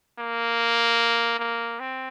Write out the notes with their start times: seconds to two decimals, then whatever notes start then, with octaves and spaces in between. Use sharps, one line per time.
0.19 A#3
1.39 A#3
1.80 C4